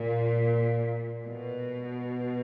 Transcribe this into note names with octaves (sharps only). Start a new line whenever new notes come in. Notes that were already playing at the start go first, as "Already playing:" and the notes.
Already playing: A#2
B2